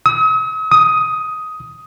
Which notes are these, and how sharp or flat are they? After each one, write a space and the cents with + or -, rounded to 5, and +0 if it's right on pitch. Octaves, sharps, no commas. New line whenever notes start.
D#6 +45
D#6 +10